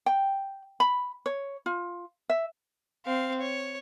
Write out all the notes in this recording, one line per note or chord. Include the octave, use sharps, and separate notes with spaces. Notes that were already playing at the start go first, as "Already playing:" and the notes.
G5
B5
C#5
F4
E5
C4 F5
C#5